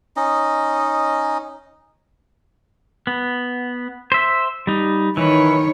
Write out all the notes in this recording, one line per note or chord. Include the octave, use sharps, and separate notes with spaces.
C#4 D#4 D#5
B3
C5 E5
G3 D#4
D#3 E3 B4 C#5